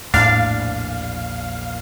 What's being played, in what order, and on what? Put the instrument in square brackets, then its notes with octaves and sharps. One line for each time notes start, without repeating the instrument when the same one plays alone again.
[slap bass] A#1 E2 [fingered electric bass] A2 [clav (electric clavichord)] D4 [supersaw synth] F5